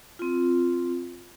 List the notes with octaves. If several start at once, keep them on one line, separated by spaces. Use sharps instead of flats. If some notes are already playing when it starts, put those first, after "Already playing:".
C4 F4